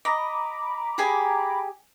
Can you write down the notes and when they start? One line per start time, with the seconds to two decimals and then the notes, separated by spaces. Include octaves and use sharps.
0.05 D#5 A#5 B5 D6
0.98 G4 G#4 G#5